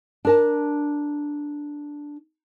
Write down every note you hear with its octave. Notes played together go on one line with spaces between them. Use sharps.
D4 A#4 A5